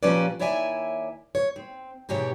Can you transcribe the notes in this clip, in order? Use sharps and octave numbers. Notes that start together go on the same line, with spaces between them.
A#2 F3 G3 C#4 B4 D5
D#2 E4 C#5 D5 E5 G#5
C#5
C4
G#2 B2 E3 G4 C#5